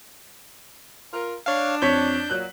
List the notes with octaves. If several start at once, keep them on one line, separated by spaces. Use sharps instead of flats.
F4 A#4
D4 C#5 F5
F2 C#5 G6 B6
A#2 F#3 F#6